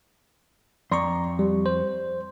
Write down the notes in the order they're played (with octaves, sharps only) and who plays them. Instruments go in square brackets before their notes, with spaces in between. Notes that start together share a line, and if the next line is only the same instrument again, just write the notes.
[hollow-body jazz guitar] F2 C6 [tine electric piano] D5 A#5 C#6
[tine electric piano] G3
C5